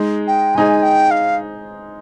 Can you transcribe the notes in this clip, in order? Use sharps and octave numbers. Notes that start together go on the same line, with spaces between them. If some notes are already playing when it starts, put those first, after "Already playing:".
Already playing: G#3 D#4 G#4
G5
G#3 D#4 G#4 G#5
G5
F5